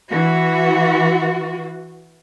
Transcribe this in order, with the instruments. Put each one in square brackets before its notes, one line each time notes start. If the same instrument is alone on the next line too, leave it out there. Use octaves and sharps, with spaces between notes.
[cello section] E3 F#4